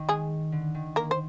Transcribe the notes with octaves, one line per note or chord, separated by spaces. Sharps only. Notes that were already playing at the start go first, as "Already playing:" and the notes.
Already playing: D#3
G#3 G#4
D3
D#3
A#3 A#4
C5